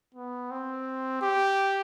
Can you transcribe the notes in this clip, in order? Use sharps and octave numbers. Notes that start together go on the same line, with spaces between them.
B3
C4
G4